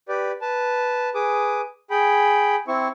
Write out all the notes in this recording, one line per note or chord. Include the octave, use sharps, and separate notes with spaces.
G4 B4 D5
B4 A5
G#4 B4 D6 D#6
G#4 G5 B5
C4 E4 C#6